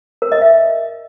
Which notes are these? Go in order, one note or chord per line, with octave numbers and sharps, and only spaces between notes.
A#4
D#5
E5